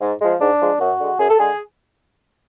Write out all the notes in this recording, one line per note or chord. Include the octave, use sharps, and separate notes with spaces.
G#2
F3 G#3
G#2 D4
F3 G#3
F#2 F#4
D3 G#3
F#2 G#4
A4
D3 G#3 G#4